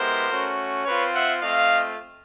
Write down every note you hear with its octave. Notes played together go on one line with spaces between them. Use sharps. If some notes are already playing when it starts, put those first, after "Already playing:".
Already playing: G#3 B3 E4 G4 A#4 C5
A3 C#4 F#4
C4 F4 B4 C#5
E5 F#5
A3 C4 F4 D#5 F5